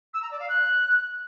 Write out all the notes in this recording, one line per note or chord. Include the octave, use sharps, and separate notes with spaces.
E6
A#5
D5
F5
F#6